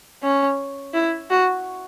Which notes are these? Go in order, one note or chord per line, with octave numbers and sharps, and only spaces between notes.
C#4
E4
F#4